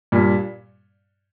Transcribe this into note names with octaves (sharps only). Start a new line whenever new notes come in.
G2 A#2